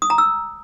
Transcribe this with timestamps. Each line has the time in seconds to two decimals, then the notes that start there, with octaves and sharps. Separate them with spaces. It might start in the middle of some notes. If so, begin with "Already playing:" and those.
0.02 D#6
0.10 A#5
0.18 E6